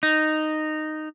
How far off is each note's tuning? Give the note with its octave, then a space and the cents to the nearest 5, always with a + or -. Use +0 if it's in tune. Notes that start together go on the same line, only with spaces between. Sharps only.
D#4 -10